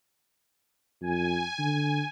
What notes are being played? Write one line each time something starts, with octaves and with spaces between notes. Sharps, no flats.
F2 G#5
D3